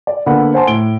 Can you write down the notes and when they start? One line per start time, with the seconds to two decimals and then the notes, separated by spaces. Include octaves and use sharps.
0.07 D5
0.26 D3 A#3 B3 A4 F#5 B5
0.54 C5 F#5 G#5 A5 C6
0.67 A2 D7 G7